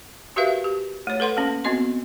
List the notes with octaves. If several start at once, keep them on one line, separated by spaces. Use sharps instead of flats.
F#4 G4 A#4 B4 E5 F5
G4
A3 C#5
A4 B4 F#5 C6
A#3 C#4
B3 C4 F#4 D#5 C6